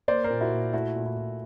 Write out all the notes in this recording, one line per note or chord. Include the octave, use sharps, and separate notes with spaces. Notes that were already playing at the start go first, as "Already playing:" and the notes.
A#3 C5 D5
A#4 C5
A#2
E4 F#4
A#2
A3 E4 F#4
A#2
E4
A#2